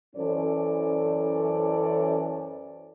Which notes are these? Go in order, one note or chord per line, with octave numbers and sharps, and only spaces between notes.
F#2 E3 C#4 A4 C5 D5